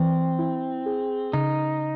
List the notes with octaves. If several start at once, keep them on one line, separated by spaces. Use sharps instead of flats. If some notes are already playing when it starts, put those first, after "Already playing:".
Already playing: E3 C4
E4
G#4
C#3 D#4